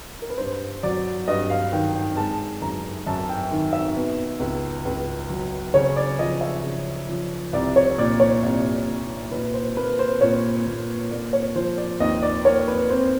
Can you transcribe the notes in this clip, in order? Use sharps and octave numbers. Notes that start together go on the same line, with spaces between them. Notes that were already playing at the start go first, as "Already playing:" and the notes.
A#4
B4
G2 C5
F#3 D5
G2 D#5
F5
D#3 G5
G5
G#3 A5
F#2 A#5
F#2 A5
G5
D#3
E5
B2
C#2
C#2
F#3
C#3 C#5
D5
F3 D#5
E5
C#3
F3
C2 D5
C#5
A#2 D5
C#5
C2
A#2
A#2 B4
C5
A#3 B4
C5
A#2 C#5
A#2
A#3 D5
C#5
F3 C5
D5
D#2 D#5
D5
A#3 C#5
B4
C4 C5